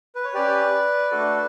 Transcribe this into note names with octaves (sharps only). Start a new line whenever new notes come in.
B4
C#5
C#4 G4 B4 D5
A3 D4 F#4 A4